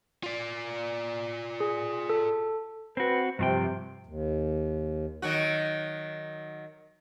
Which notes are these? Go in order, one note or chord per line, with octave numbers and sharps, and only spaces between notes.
F4 D5
G#4
A4
C4 F#4 B4
G2 C3 F3 G5
D#2
D#3 F#3 F#4